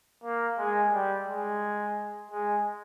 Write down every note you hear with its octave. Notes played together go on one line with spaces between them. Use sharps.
A#3
G#3
G3
G#3
G#3